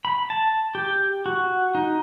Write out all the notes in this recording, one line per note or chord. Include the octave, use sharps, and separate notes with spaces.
B5
A5
G4
F#4
D#4